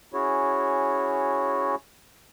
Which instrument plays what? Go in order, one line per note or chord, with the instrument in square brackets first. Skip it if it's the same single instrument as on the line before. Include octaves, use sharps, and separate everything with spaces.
[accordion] C#4 E4 F#4 G#4 C#5